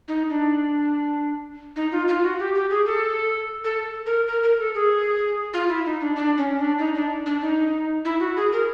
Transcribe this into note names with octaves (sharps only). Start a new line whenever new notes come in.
D#4
D4
D#4
F4
F4
F#4
G4
G4
G#4
A4
A4
A#4
A#4
A#4
A4
G#4
F4
E4
D#4
D4
D4
C#4
D4
D#4
D4
D4
D#4
E4
F#4
G#4
A#4